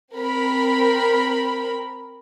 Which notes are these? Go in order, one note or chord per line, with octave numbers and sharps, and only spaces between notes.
C4 A#4 B5